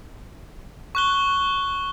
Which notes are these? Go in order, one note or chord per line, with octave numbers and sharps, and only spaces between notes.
C#6 F#6 G7